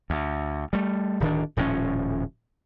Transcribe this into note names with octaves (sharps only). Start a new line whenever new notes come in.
D2
G3 A3
D1 D#3 D4
D#1 A2 F3 C#4